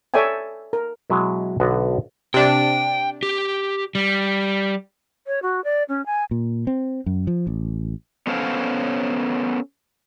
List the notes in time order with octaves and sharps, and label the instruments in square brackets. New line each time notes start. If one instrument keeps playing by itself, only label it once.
[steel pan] A4 C#5 D5 E5 G5 G#5
A#4
[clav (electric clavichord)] B2 F#3 G#3 E4
B1 D3 B3 F#4 F#5
[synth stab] C3 D4 [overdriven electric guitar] G5
[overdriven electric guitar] G4
G3
[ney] C#5
F#4
D5
C#4
G#5
[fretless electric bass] A#2
C4
F#2
F3
A1
[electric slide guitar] B3 C#4 A4 C5 C#5 F5